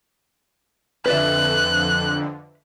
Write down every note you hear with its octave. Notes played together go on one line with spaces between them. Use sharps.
F2 D3 B4 D5 E5 F#6